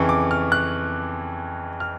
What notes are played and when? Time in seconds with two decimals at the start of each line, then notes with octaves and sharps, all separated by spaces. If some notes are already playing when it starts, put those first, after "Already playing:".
Already playing: F2 C#3 E3 C#6
0.09 D6
0.31 F6
0.52 F#6
1.80 F6